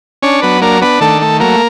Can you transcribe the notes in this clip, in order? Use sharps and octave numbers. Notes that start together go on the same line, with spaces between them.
C#4 D4 C#5
F#3 B3 B4
A#3 D4 A#4
B3 D4 B4
D#3 A3 A4
A3
F#3 A#3 A#4